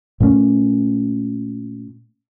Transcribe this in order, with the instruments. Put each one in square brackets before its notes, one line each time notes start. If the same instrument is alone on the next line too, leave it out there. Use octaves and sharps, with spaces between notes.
[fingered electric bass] A#2 A3 A#3 C#4